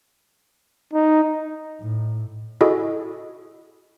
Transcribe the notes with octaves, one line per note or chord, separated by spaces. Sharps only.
D#4
A2
E4 F#4 G#4 A4 D#5